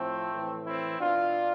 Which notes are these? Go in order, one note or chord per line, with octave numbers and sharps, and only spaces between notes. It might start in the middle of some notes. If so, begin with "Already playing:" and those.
Already playing: A2 F3 A3 C4
A2 E3
C4 E4
B2 D4 F4